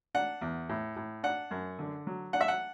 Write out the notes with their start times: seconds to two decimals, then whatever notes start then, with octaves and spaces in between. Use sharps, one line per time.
0.15 D4 F#5
0.41 E2
0.69 A2
0.96 A2
1.23 D4 F#5
1.51 F#2
1.79 D3
2.07 F#3
2.33 D4 F#5
2.41 E5
2.48 F#5